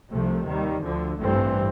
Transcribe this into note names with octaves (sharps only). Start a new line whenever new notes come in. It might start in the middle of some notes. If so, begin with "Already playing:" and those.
C2 C3 F3 A3
D#2 D#3 G3
D2 D3 F3
A1 G2 E3 A3 C4